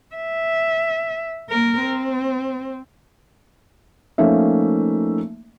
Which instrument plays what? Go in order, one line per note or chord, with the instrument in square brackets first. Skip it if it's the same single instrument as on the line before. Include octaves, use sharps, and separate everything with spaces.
[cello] E5
A#3 A#4
C4
[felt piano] F3 A3 A#3 C#4 D#4 E5